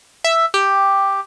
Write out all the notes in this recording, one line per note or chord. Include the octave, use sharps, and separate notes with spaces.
E5
G4